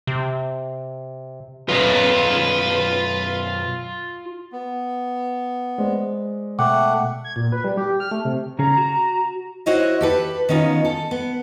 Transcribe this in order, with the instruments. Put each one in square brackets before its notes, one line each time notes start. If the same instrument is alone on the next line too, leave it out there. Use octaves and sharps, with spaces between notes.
[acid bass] C3
[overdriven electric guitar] B1 F#2 [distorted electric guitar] F4 D#5 [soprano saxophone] B4
[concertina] B3
[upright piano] G#3 C5 D5
[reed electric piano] B2 G5 [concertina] A3 F#5 [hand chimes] D6
[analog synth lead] G#6
A#2
B4
G3
G4
F6
A3
C3
[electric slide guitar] C#3 C#4 G#4 [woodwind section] A#5
[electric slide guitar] F#4
[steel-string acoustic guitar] E4 F#4 C5 C#5 D#5 E5
G4 A4 B4
D#3 B3 C#4 D#4 F4
A4
B3